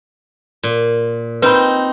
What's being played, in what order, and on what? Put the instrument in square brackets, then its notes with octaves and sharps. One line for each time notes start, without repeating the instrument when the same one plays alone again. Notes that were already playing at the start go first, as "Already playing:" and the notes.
[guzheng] A#2
[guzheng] C4 D#4 [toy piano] B4 B5